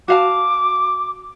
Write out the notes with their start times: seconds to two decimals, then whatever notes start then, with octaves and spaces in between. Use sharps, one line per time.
0.08 F#4 F5 A5 D6